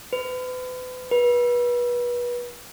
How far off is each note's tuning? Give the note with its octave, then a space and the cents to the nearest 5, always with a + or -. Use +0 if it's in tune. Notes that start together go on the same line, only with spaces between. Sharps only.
B4 +40
B4 -30